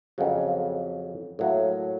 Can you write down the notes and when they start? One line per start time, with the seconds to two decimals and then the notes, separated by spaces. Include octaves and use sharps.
0.18 F2 C#3 F#3
1.39 A2 F#3 A#3